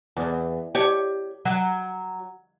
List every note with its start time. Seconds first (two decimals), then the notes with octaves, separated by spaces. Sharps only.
0.17 E2
0.75 G4 C#5
1.45 F#3